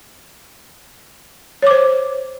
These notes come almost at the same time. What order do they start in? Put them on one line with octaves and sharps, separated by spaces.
C#5 D6 C5